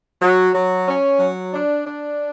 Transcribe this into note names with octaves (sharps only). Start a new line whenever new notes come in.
F#3
F#3
C#4
F#3
D4
D4